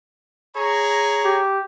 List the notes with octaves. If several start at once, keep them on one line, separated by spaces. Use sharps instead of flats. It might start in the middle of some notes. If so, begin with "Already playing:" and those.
G#4 C#5 A#5
G4